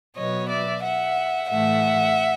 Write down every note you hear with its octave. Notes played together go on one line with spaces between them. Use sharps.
B2 F#3 B3 C#5 D#5
D5 E5
E5 F#5
A2 E3 A3 E5 F#5